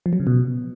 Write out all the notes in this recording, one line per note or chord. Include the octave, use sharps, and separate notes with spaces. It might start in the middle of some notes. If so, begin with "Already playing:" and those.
F3
F#3
C#3
B2